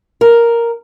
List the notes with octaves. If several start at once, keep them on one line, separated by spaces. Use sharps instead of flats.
A#4